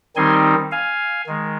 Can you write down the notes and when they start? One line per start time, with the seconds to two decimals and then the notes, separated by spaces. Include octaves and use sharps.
0.16 D#3 G3 C4 D#4 G#5 C6
0.71 F5 G#5
1.27 D#3 G#3